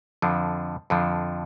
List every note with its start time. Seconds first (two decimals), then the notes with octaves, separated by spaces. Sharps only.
0.22 F2 D3 F3
0.90 F2 D3 F3